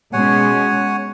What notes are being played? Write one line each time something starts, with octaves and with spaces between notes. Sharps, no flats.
B2 G#3 C#4 C#5 F#5 G#5